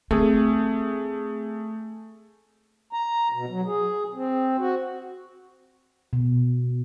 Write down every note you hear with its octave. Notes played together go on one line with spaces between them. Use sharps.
A3 C4 G#4
A#5
B2
F#3
G#4
C4
F#4
B2